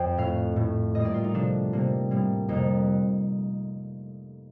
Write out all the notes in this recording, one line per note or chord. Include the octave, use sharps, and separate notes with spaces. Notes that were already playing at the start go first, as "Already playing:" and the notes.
Already playing: F2 G5
A2 A3 F5
A2 A3
A2 G3 A#3 D#5
D5
F4
D#4
C3 F3 A3 D4
C3 G3 A#3
A2 G3 A#3
F2 C3 G3 A#3 D#4